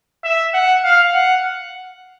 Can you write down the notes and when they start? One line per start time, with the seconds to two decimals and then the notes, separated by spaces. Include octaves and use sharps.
0.24 E5
0.54 F#5
0.84 F5
1.14 F#5